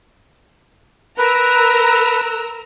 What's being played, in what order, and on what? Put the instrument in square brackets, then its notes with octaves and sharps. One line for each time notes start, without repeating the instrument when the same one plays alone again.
[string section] A#4 A#5 E6 [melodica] B4